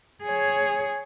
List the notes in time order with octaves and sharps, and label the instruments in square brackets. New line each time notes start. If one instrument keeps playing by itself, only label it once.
[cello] G#4 C#5